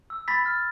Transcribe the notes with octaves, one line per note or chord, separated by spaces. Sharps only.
E6
B5 A6 B6
F6